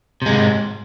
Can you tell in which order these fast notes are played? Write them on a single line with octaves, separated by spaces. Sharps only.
C3 G#3 G#2